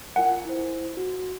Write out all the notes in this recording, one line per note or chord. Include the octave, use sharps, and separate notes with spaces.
F4 A#4 F#5 G#5
E4 C5
F#4